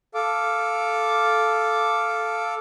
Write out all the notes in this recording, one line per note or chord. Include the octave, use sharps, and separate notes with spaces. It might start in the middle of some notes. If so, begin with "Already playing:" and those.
A4 F5 D6